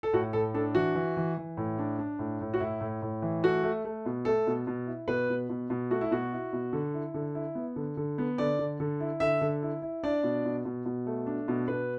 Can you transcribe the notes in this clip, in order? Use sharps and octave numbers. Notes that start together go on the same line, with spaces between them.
A4
A2 F#4
A2 A4
D4 A4
E3 F#4
E3
E3
E3
A2
D4
D4
A2
A2
F#4
A2 E4
A2
A2
E3
A3 F#4
A3
A3
B2
A3 A4
B2
B2
E4
B2 B4
B2
B2
B2
A3 F#4
E4
B2 F#4
E4
B2
D3
E4
D3
E4
B3
D3
D3
B3
D3 D5
D3
D3
E4
D3 E5
D3
E4
E4
D4 D5
B2
B2
B2
B2
A3
D4
B2
B2 B4